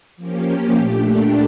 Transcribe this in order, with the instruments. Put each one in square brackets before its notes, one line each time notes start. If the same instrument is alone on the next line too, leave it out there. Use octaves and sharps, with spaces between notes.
[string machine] F3 A#3 C#4 G4
A#2 A3 D4 G4